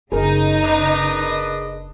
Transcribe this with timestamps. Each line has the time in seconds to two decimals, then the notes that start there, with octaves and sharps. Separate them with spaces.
0.12 F#1 C#3 D#4 G#4 A#4
0.65 D4 B4 D#5